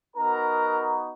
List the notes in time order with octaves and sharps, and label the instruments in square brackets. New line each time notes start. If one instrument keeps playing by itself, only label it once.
[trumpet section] B3 D#4 F#4 A#4 A#5